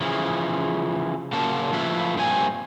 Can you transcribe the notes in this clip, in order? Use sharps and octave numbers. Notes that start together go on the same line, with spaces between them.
C#3 E3 F3
C#3 A#3 F4 F#4 A5
F3 A3 E4 F4 B4
G2 A#2 C4 G#5